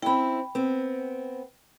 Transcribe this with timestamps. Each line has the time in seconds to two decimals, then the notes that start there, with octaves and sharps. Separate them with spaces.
0.02 C4 C#4 E4 G5 B5
0.55 B3 C4